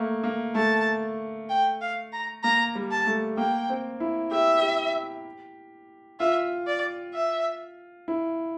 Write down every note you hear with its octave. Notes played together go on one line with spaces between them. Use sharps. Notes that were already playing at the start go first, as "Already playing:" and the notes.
Already playing: A3 A#3
A#3
A3 A5
G5
F5
A#5
A#3 A#5
G3
A5
A3
A#3 G5
C4
E4
G4 E5
G4
F4 E5
D5
E5
E4